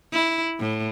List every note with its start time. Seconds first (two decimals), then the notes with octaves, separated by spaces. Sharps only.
0.13 E4
0.59 A2